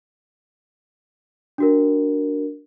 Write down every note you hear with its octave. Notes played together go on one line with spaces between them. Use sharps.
D4 F#4 A#4